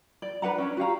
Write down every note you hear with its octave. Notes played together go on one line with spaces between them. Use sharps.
D5
D4 B4 F#5 A#5
C#4 D4
F#4 G4 F5 A#5